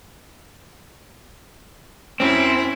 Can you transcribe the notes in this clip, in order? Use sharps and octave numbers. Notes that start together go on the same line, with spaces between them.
F#2 C4 C#4 E4